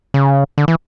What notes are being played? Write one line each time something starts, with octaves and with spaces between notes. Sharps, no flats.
C#3
D3
E3